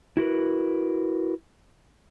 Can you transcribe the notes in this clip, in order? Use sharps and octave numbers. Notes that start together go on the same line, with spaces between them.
E4 F#4 A#4 B4